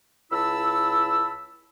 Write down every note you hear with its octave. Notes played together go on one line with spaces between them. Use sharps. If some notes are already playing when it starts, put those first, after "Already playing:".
C#2 E4 A5 B5 E6